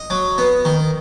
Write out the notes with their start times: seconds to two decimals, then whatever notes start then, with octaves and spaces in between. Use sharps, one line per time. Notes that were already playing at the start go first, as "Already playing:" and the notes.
Already playing: D#5
0.10 F#3
0.38 B3
0.65 D#3